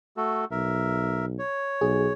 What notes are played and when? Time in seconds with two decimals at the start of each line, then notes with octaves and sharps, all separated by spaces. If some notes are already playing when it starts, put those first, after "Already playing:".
0.17 A3 F#4 A4
0.51 B1 A#4 E5
1.39 C#5
1.81 B1 G#4